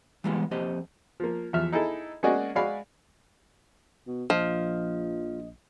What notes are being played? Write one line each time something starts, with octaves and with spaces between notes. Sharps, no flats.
E3 G3 G#3 A#3 B3 F4
F2 A#3 G4 C5 D#5
F3 A#3
E2 F3 E5 F6
D#4 E4 G#4 A4
G#3 A#3 C#4 F#4 D5 D#5
G#3 F#4 D5 F5 G#5 B5
B2
A#1 F3 D#5